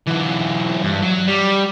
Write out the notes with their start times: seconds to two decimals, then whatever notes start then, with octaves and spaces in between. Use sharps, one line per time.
0.07 E3 F#3
0.83 G2
1.02 F#3
1.27 G3